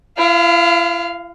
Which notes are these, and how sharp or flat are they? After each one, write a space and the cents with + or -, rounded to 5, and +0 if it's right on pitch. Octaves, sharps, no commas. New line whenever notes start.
E4 +45 F5 +0